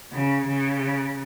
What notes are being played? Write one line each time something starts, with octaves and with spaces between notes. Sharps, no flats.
C#3
C#3